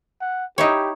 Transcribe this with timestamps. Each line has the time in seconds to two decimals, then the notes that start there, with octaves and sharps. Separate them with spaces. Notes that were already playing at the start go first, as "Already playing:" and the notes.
0.21 F#5
0.58 D#4 E4 G4 C#5